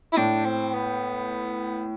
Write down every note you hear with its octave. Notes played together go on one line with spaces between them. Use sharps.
E4
A2 D4
C4
B3